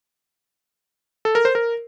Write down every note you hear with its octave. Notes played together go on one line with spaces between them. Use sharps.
A4
A#4
C5
A#4